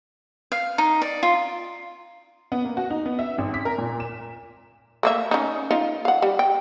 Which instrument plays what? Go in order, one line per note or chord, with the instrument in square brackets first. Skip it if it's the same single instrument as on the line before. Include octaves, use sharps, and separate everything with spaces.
[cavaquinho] F5
D#4
D5
F4
[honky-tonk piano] B3
A#3
F#4
D#4
B3
E5
G#1
B6
A#4
A#2
E7
[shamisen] A3 A#3 E5
C#4 D#4
D#4 F4
F5 F#5
G3
G5